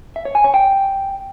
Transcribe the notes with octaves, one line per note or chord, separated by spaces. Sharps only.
E5
C#5
G#5
C#5
G5